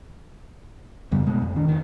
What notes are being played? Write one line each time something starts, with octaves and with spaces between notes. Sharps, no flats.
F#2 C#3 G3 B3
B2 G#3 A3 B3
F2
D#3 D4
F1 D#3